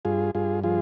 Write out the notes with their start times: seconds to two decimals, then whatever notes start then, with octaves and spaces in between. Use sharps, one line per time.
0.05 G2 F4 G#4
0.35 G2 F4 G#4
0.63 F3 F4 G#4